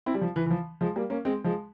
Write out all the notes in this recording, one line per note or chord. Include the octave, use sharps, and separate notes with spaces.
C4 E4
G3
F3
E3
E3
F3
F3 G#3
G3 A#3
A#3 C#4
G#3 C4
F3 G#3